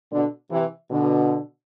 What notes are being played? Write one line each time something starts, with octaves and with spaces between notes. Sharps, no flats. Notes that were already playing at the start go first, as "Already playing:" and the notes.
B2 D3
C3 E3
B2 D3